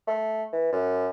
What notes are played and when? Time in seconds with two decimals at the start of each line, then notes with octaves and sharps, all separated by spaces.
0.07 A3
0.53 E3
0.72 F#2